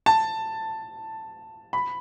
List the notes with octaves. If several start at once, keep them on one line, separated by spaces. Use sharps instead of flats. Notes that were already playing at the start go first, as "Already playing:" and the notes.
A5
B5